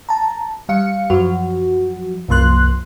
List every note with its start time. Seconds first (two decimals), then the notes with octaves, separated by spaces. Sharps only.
0.09 A5 A#5
0.69 G3 F5 C#7
1.10 F#2 F3 F#3 F#4
2.28 C2 F#2 F3 A#3 C6 F#6